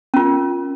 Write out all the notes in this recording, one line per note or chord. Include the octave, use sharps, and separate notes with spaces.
C#4 F4 A#4